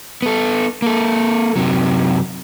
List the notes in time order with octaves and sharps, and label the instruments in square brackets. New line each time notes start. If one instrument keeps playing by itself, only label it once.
[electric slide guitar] B3 A4
A#3 A4
F#2 C3 F#3